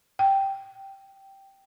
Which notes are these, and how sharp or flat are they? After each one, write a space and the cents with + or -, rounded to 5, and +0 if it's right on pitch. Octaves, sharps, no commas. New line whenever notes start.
G5 -5